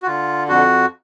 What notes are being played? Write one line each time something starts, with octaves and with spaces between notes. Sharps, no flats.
F#4
D3 F4
F2 F#4